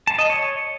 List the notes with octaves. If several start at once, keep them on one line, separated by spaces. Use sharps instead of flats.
A5
D#5
C#5